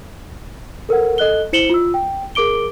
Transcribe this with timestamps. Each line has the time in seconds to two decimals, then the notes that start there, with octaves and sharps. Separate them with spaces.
0.89 A4 A#4 C5 F#5
1.18 A4 D#5 F#6 G7
1.53 E4 C5 C#7 E7 F#7 G7
1.70 F4 E6
1.94 G5
2.35 G#4 A#4 D6 D7 G7